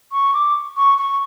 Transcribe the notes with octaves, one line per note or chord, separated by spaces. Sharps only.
C#6
D6
C#6
C#6